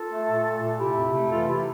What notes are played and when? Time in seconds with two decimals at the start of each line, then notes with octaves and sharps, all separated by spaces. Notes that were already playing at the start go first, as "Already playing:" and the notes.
Already playing: F4 A4
0.11 A3
0.28 A#2
0.45 A3
0.62 A#2
0.79 C3 E4 G4
0.96 F2
1.14 A3
1.30 E3 F4 A4
1.47 C3 E4 G4